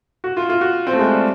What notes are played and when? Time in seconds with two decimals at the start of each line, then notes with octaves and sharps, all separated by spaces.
0.24 F#4
0.37 F4
0.49 F4
0.61 F#4
0.87 C4
0.93 A3
0.99 G#3
1.11 G3